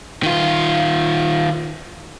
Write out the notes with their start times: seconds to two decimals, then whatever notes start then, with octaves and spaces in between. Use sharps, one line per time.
0.23 D#3 F4